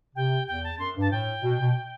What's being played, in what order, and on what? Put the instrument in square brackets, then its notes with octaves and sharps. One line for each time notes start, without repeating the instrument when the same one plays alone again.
[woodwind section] C3 [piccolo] G5
[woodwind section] E2 [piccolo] G5
[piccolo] A5
[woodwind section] F#2 [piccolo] C6
[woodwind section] G2
[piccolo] A5
[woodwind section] A2 [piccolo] G5
[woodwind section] B2
B2